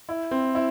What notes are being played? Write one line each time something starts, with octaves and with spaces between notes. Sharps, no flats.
E4
C4
E4